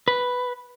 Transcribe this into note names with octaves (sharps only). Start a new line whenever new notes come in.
B4